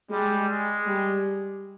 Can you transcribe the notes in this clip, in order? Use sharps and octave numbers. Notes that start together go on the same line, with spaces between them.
G3 G#3
G#3
G3